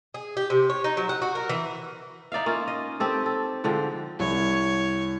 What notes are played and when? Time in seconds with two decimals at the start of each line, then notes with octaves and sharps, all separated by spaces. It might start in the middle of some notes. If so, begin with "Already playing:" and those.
0.14 G#4
0.37 G4
0.50 C3
0.70 C#5
0.84 D#4
0.97 F#3
1.09 F#5
1.22 F#4
1.35 A#4
1.49 E3
2.32 D#4 D5 E5 F5
2.46 A#3 C#4 F4
2.68 D#5
3.00 C4 G4 A4
3.26 A4
3.64 G#2 D3 F3 G5
4.20 C2 C#5